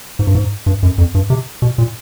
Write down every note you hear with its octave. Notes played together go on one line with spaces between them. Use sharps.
G#2
G2
G#2
G2
F#2
F2
G2
C3
B2
A#2